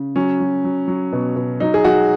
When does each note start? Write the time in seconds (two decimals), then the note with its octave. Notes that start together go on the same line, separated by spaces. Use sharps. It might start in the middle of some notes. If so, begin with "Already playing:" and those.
Already playing: C#3
0.16 F#3 C#4
0.40 F#3
0.64 F#3
0.88 F#3
1.13 B2
1.36 B2
1.60 F#3 D#4
1.74 G#4
1.84 F#3 F#4